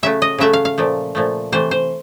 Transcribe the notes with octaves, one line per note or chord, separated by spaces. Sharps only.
C#3 F#3 A3 E5
D#5
C#3 F#3 A3 E5
F5
F5
A#2 F3 A3
A#2 F3 A3
C3 E3 A3 C5
C5